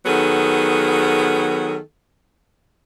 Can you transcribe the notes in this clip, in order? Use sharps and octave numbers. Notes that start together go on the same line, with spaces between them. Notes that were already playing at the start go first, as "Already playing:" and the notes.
D#3 F#3 B3 G#4 A4